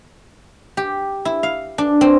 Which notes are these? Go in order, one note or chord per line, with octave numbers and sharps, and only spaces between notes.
G4
E4
F5
D4
C4